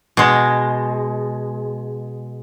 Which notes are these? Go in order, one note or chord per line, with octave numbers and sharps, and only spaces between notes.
B2 G#3